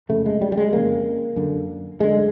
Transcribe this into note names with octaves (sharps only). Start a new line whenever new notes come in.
F2 C#3 A3
G#3
G3
G3
G#3
F2 C#3 A#3
F#2 D3
F#2 D3 G#3